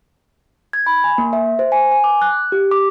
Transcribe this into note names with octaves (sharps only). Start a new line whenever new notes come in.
G#6
B5
G#5
A#3
E5
C5
G#5
G#5
D6
F#6
G4
D6